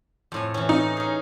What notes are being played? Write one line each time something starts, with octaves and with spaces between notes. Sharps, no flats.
F2 A2 G#5
E3 C#4
D#4
C#4 G#4